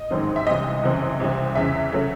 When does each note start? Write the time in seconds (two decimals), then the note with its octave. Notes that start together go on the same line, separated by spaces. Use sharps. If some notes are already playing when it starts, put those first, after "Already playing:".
Already playing: D#5
0.11 A1 G#2 D#3 F#3 C4
0.36 E5
0.47 C2 C3 E3 D#5
0.83 F#1 F#2 E3 C4
1.20 C2 C3 E3 C4
1.55 E2 C#3 E3 E5
1.92 C#3 F#3 A3